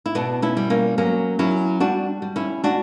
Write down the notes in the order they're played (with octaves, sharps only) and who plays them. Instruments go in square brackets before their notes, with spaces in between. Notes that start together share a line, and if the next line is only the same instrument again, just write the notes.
[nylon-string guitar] E4
B2 B3 D4
C#4 E4
G3
A#3 C#4
F#3 A#3 C#4
F#3 C#4 E4
G3 D4 F#4
G3
C#4 E4
D4 F#4